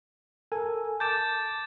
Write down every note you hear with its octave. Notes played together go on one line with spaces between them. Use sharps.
A4 A#4 G#5
A5 D6 G6 A6 E7